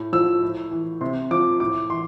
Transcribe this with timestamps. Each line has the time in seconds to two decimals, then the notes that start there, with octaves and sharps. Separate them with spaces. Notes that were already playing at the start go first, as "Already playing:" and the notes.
Already playing: A2
0.13 F3 E6
0.42 A2
0.71 E3
1.01 C3 C6
1.31 F3 D6
1.60 A2 D6
1.90 E3 C6